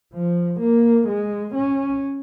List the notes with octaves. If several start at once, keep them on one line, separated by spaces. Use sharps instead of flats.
F3
A#3
G#3
C#4